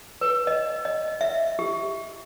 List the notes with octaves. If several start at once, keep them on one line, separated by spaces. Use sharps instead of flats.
B4
D#5
D#5
E5
G4